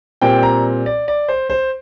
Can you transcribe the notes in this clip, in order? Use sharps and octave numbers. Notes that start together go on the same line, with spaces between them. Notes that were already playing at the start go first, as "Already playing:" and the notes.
A#2 G3 C4 G5
A#5
D5
D5
C5
C5